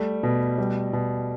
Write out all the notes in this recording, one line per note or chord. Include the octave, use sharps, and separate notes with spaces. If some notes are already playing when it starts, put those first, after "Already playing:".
Already playing: G3 A3
B2
G3
B2